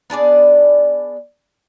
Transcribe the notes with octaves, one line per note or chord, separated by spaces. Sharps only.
B3 D4 G#4 D5